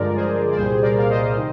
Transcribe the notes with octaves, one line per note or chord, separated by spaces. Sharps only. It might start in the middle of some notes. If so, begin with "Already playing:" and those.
Already playing: G2 D3 F3 G#3 A#4 D5
G#4 C5
D5
C2 A#2 G3 G#4 C5
A#4 D5
F5
C5 D#5
C3 D#3